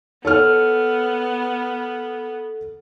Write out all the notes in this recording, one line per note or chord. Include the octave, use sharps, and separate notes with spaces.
B3 A4 C#5 F6